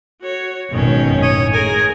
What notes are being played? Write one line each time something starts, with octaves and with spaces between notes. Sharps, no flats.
F#4 C#5
G#1 F#2 B2 D#3 C#4
A2 C#5 D#6
G#4 A#4 G#5